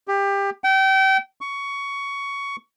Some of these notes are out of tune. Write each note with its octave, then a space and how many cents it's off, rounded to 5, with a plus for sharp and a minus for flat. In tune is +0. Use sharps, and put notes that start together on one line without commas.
G4 +20
G5 -30
C#6 +15